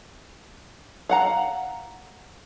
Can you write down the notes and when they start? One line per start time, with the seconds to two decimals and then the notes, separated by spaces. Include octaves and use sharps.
1.09 F5 F#5 A#5